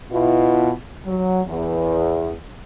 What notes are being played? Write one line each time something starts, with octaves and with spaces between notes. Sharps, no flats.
B2 E4 F4
F#3
E2